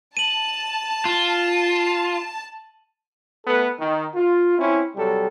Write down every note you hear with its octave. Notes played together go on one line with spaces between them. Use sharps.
A5 D#7 F#7
F4
A3 B3 A4 B4
D#3
F4
C4 C#4 E4
C3 F#3 G3 A4